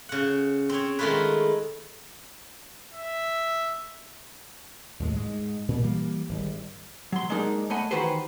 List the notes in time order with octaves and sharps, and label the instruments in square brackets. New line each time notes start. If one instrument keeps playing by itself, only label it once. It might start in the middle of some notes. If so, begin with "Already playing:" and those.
[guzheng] C#3 F#5
C4 C#5
D#3 G#3 A3 F4 G#4 B4
[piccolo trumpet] E5
[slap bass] D#2 A2 G#3
G#2 G#3
A#2
E3 G3 A#3
G#1 G3
[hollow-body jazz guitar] F#3 C6
G#3 A#3 D4 D#4 A#4
A3 D#5 F#5 G#5 B5
D#3 E3 F#4 G4 B4 C5